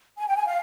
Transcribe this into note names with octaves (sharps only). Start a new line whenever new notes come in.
G#5
G5
G#5
F5